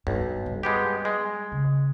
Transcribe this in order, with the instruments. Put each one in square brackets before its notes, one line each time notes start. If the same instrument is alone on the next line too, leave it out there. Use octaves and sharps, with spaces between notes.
[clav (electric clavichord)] B1 [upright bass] G2
[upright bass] G3
[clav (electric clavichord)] G#3 B3 G4
G#3
[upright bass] C#3